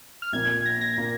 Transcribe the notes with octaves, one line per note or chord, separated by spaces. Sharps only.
F6
A#1 A#2 A#3 G#6
A#6
A#6
A#2 A#3 A#6